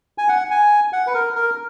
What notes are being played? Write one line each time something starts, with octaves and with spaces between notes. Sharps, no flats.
G#5
F#5
G#5
F#5
B4
A#4
A#4